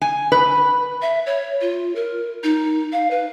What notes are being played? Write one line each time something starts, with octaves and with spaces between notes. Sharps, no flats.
G#5
B4
E5
C#5
F4
A#4
D#4
F5
B4